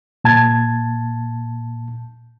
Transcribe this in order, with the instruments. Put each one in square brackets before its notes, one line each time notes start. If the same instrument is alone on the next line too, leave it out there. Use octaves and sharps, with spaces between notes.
[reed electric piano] A#2 A5 G#6